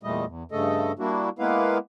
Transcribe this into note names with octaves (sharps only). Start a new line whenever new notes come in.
E2 A#2 G3 A3 D#5
E2
G2 C#3 A3 A4 D#5
G3 A#3 D4 E4 F#4
G#3 A#3 B3 E4 B4 F5